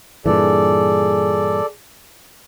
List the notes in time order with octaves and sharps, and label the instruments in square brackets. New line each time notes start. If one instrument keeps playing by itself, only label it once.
[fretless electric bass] G2 A#2 E3 [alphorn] G#4 [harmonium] A4 D5